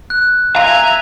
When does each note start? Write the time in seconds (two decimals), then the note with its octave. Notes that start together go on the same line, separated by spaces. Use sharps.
0.10 F#6
0.56 E5 F5 G#5 A#5